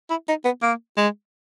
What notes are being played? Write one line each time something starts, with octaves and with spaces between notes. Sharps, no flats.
E4
D#4
B3
A#3
G#3